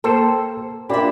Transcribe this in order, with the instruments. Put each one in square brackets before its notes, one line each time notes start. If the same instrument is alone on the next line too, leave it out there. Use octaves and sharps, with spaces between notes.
[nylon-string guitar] A#3 A#4 G5 [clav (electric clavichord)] A4 C5
[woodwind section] A#2 B5 [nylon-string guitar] D4 E5 [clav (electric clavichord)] G4